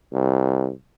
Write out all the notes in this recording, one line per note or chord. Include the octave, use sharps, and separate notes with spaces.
C2